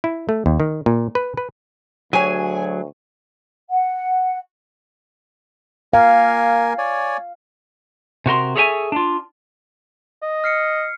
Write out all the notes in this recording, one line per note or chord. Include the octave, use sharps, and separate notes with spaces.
E4
A3
D#2
D#3
A#2
B4
B4
D2 F#3 G4 G#4 C#5 G#5
F#5
A#3 A#4 F5 G#5
C#5 D5 G#5
C3 F#4 A#4 C6
G#4 A4 C#5 E5 F#5 G#5
D4 F4
D#5
F6 C7 C#7